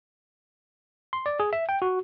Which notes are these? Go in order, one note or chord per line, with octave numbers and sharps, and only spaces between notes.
C6
D5
G#4
E5
G5
F#4